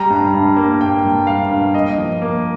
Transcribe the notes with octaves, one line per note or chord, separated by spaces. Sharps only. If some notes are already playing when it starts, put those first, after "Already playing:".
Already playing: G3 A#5
G2
G2
A#3
A#3 G5
G2
G2 F5
G2
A#3 D#5
F3
A#3